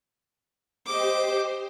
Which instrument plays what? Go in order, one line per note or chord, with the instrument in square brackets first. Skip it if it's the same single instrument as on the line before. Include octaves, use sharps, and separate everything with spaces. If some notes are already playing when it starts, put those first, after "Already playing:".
[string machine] G4 C5 [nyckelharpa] D#5 D6